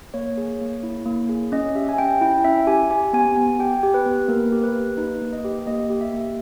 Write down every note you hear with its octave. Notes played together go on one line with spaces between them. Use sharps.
A#3 C#5
G#4
A#3
E4
A#3
G#4
C#4 D#5
G4 E5
G#5
C#4 G5
E4 G5
C#4 E5
G4 G#5
G4 G#5
B3 G#5
B3 G#5
G4 G5
G4
B4
B3
A#3 A#4
G4
B4
A#3
D#4 B4
A#3
D#5
G4
A#3 D#5
G4
E5
A#3